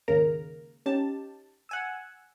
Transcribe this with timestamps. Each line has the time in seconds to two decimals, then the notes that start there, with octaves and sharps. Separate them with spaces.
0.08 D#2 G#2 C#3 A#3 A#4 A#5
0.86 C#4 D#4 G4 A5
1.69 F#5 G#5 E6